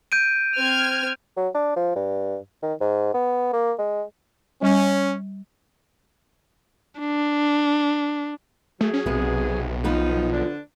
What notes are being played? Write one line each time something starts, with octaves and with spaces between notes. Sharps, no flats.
G6 D7 D#7
C4 F6 G#6
F#3
D4
F3
G2
D#3
G#2
B3
A#3
G#3
G3 C#4
D4
F#3 A3 G#4
C#4
B1 C3 B3
F3 B3 D#4 B4
D3 D4